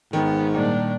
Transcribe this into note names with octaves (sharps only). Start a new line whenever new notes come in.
G#2 D#3 B3
A#2 G3 A#3 D4